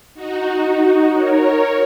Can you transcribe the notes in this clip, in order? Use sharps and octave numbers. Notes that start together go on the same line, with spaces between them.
D#4 F#4
D#4 F#4
A#4 C#5